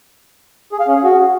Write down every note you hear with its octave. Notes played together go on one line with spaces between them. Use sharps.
G#4
F5
C#4
G#4
F#4